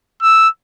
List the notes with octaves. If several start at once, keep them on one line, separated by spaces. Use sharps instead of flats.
E6